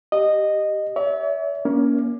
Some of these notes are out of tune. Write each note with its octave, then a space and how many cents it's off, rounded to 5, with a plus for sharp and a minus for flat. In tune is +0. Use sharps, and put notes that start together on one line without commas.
G4 -5 D#5 -10
C#5 +45 E5 -25
A#3 +25 C#4 +20